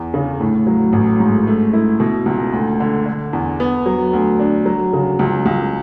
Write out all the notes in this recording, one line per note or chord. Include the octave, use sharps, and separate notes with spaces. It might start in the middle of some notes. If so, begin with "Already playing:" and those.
Already playing: E2
C#3
A2
F#3
A1
G#2
A3
E4
B2
C#2
D2
D3
D3
E2
B3
F#3
D2
D4
F#3
C#3
C#2
C#2